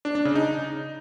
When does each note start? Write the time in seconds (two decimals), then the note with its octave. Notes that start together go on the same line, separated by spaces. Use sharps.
0.05 D4
0.15 D4
0.25 C#3
0.35 D#4